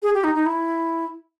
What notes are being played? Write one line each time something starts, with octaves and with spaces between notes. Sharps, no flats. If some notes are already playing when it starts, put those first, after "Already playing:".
G#4
G4
D#4
D#4
E4